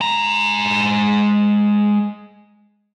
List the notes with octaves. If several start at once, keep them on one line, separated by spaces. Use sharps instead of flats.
G#3 A#5